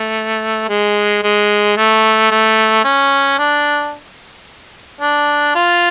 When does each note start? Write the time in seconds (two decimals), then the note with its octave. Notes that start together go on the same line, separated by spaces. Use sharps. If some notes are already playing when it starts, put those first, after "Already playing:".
Already playing: A3
0.69 G#3
1.23 G#3
1.77 A3
2.31 A3
2.84 C#4
3.39 D4
5.01 D4
5.55 F4